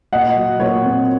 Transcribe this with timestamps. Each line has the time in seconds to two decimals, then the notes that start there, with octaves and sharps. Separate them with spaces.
0.13 A#2 D#5 F#5
0.36 F#3
0.59 A#2 C#5
0.82 C4